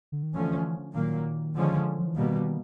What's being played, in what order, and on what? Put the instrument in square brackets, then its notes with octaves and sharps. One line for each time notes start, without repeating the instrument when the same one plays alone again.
[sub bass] D3
D#3
[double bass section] D3 F3 A3 C#4 [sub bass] E3
[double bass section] A#2 F#3 A#3 [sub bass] D#3
[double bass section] D3 F3 G#3 C#4
[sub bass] F3
E3
[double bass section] B2 G3 A#3 [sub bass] D#3